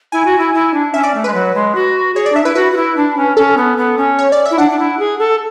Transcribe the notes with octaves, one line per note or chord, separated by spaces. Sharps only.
E4 G#5
F#4
E4
E4
D4
C#4 E5
D5
A3
G#3 B4
F#3
G#3
F#4
G#4 C#5
D5
D4 E5
E4 B4
F#4 B4
F#4
E4
D4
C#4
C#4 A4
B3
B3
C#4
C#5
D5
E5
E4
D4 F#5
D4
E4
G#4
A4